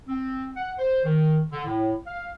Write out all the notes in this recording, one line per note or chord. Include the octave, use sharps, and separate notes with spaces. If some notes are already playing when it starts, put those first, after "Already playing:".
C4
F#5
C5
D#3
D3
A2
F5